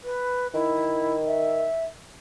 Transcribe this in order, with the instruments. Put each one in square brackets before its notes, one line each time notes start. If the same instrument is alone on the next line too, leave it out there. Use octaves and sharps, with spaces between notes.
[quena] B4
[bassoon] D#3 [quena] E4
[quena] E5